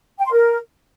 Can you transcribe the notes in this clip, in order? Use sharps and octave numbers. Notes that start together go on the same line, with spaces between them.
G5
C6
A#4